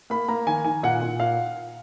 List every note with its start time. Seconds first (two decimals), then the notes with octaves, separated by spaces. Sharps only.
0.10 A#3 B5
0.28 A#3 A#5
0.47 D#3 G#5
0.65 D#3 G#5
0.83 A#2 F#5
1.02 A#2
1.20 A#2 F5